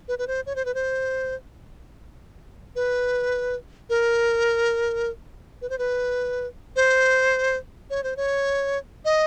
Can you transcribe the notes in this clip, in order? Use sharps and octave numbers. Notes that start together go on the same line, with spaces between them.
B4
B4
C5
C#5
C5
B4
C5
B4
A#4
B4
C5
B4
C5
C#5
C5
C#5
D#5